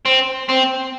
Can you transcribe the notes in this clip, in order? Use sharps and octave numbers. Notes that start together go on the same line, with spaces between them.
C4
C4